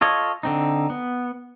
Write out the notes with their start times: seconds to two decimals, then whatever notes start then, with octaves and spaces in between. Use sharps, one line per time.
0.01 F4 A4 C#5 D#5
0.43 D3 C4 D#4
0.90 B3